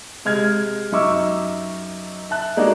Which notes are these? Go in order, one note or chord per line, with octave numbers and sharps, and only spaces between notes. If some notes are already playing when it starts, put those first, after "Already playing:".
C3 G#3 F6 G#6
F#2 D#4 E5 C#6 D6 E6
E5 A5 F#6
G#3 A#3 D4 D#4 F#4